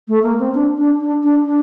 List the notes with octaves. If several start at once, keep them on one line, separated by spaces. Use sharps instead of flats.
A3
A#3
C4
D4
D4
D4
D4
D4